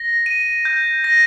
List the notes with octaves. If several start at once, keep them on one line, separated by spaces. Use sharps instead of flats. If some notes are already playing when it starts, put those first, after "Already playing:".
Already playing: A#6
D#7
G6
A#6